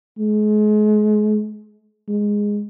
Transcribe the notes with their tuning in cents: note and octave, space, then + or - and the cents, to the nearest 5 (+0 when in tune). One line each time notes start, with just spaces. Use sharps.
G#3 +35
G#3 -10